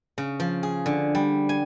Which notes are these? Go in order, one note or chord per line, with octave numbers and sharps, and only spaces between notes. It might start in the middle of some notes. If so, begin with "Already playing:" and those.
C#3
F3
G#4
D3
G3
G#5